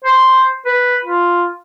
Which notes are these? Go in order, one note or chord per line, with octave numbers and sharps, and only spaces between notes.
C5
B4
F4